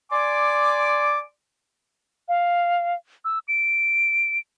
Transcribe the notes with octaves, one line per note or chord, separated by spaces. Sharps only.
D5 G#5 C6 D6
F5
E6
D7